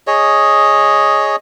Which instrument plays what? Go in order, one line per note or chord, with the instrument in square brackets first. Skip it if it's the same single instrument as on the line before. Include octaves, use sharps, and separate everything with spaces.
[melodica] G#4 C#5 D#5